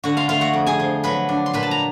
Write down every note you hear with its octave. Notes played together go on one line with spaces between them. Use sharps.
D3 F#4 F#5
F4 F5
A3 F4 F5
F#4 F#5
F2
G#4 G#5
F3
F#3 B4 B5
D4
C6
A#2 B4 B5
A5
A#5